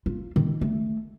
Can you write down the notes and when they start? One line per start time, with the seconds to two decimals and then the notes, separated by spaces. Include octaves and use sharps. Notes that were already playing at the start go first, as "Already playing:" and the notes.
0.06 F4
0.36 D#3
0.61 A3